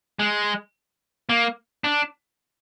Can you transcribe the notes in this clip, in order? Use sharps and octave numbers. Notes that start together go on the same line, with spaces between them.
G#3
A#3
D4